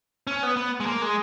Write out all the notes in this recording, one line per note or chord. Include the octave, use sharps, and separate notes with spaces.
C#4
B3
B3
G#3
A#3
G#3